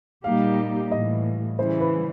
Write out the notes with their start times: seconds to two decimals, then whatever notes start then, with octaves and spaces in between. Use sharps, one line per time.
0.24 A#2 G3 A#3 D#4 G4 F5
0.91 A2 E3 G3 D#5
1.59 C#3 E3 G3 C5
1.80 B4